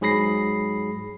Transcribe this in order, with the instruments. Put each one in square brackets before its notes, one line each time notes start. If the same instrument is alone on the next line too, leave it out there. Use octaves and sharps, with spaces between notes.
[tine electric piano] G#2 F#3 G#4 B5 A#6 C7